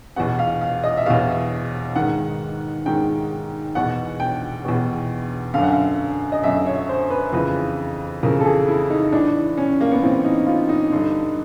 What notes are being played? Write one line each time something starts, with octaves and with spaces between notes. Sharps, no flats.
E2 B2 F#5
F5
F5
D#5
E5
E2 B2 F5
G#2 D#3 F#5
G#2 D#3 G5
E2 B2 F#5
G5
E2 B2
F#2 D3 F5
F#5
F5
D#5
F#2 D3 E5
C#5
C5
B4
F2 C#3 E3 B4
F2 C#3 E3 A#4
A4
G#4
E4
D#4
A2 E3 D4
C#4
A#3
B3
A2 E3 C4
D#4
F4
D#4
G2 D3